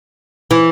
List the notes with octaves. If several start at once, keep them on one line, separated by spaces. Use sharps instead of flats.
E3